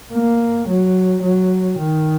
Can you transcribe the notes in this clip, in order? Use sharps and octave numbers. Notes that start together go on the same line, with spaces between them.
A#3
F#3
F#3
D#3